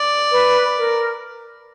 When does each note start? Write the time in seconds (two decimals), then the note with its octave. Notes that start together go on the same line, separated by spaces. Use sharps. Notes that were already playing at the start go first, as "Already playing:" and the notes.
Already playing: D5
0.31 B4
0.78 A#4